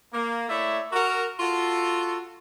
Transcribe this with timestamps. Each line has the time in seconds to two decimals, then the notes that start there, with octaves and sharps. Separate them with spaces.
0.13 A#3
0.49 A3 E4 C#5 D5 E5
0.93 F#4 A#4
1.40 F4 F#4 A4